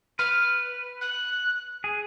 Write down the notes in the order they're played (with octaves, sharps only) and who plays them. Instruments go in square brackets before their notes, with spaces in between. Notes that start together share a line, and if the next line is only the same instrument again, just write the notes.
[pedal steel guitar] B4 [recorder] F6
[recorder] F#6
[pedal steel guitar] G#4